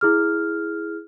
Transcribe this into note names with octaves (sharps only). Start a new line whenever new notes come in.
E4 G#4 F6